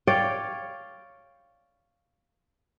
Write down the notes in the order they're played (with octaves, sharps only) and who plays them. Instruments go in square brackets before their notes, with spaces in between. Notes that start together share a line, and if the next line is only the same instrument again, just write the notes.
[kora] C#5 D5 F5 G5